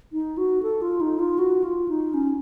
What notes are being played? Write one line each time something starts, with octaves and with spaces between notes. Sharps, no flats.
D#4
F#4
A4
F4
D#4
F4
F#4
F4
D#4
C#4